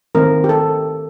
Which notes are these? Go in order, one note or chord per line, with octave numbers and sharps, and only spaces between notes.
D#3 A3 C4 A#4
G4
A4